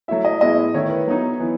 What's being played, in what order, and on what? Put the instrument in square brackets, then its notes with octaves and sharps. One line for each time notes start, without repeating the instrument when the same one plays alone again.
[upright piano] F#3 A3 E4 [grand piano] E5
[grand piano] D#5
[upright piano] A2 G#3 B3 E4 [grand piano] D#5
[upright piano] D#3 A3 E4 [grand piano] C#5
[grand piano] B4
[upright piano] F#3 B3 D#4
E3 B3